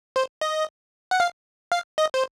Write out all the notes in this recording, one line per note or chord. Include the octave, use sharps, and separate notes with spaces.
C5
D#5
F#5
F5
F5
D#5
C5